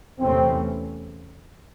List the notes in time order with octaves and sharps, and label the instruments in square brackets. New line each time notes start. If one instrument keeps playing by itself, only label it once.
[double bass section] E2 C3 E3 A3 C#4 [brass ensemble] C4